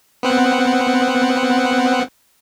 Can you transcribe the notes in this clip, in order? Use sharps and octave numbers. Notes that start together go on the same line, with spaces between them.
B3 C4 F#5